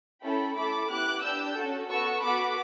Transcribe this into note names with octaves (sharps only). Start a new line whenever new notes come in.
C#4 E4 A4 G5 B5
A3 E4 A4 B5 D6
B3 E4 G4 D6 F#6
D4 G4 E6 G6
C#4 F#4 A4
B3 F#4 A4 C#6 E6
B3 F#4 A4 B5 D6